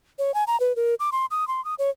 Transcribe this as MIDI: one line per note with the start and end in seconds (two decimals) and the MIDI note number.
0.19 0.34 73
0.34 0.44 80
0.47 0.59 82
0.60 0.75 71
0.76 0.95 70
1.00 1.10 86
1.12 1.26 84
1.31 1.47 87
1.48 1.63 84
1.65 1.75 87
1.79 1.90 73